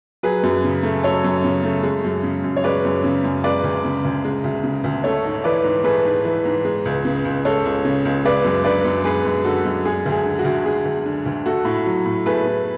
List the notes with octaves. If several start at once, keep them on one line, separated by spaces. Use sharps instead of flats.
F#3 G#4 B4
F#2
C#3
A3
F#3 A4 C#5
F#2
C#3
A3
G#3
F#2
C#3
F#2
C#5
G#3 B4 D5
F#2
C#3
F#2
G#3 B4 D5
D2
C#3
D2
G#3
D2
C#3
D2
A3 A4 C#5
G#2
E3 B4 D5
G#2
A3 G#4 B4
G#2
E3
G#2
G#3
C#2
C#3
C#2
G#3 A4 C#5
C#2
C#3
C#2
G#3 B4 D5
F#2
D3 B4 D5
F#2
G#3 G#4 B4
F#2
D3 F#4 A4
F#2
G#3 G#4
D2
G#4
D3
F#4
D2
G#3 G#4
D2
D3
D2
A3 F#4 A4
A2
F#3
A2
A3 G#4 B4
A2